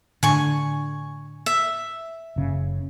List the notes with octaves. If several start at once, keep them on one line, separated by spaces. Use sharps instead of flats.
A2 D3 G#5 C#6
E5
F#1 C#3